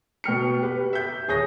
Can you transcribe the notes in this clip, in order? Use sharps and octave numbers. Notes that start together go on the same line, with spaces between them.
B2 G5 F6 C#7
G4 B4
E5 G6
D#1 G#4 C#5 D#6 G6 A#6